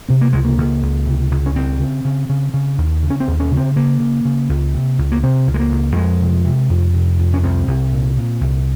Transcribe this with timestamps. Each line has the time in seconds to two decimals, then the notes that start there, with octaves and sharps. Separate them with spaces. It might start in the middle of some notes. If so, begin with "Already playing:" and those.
0.09 C3 C4
0.21 A#3
0.33 C#2 G#3
0.45 A#3
0.58 C#2
0.83 C#2
1.06 C3
1.31 C#2
1.46 C#4
1.55 C#3 C4
1.80 C#3
2.05 C#3
2.29 C#3
2.54 C#3
2.78 D#2
3.02 C#3
3.10 C#4
3.20 C4
3.27 D#2
3.40 C#4
3.51 C#3
3.57 C4
3.76 C#3 A#3
4.00 C#3
4.25 C#3
4.49 C#2
4.74 C3
4.98 C#2
5.12 A#3
5.23 C3 C4
5.47 C#2
5.54 G#3
5.59 A#3
5.72 C#2
5.96 F2 G#3
6.21 C3
6.45 C3
6.70 F2
6.94 C3
7.19 F2
7.34 C#4
7.43 C2 C4
7.67 C2
7.92 A#2
8.17 A#2
8.41 C2